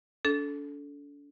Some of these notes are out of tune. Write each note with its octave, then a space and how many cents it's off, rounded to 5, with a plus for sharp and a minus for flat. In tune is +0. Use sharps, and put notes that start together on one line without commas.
D4 -40 A4 -15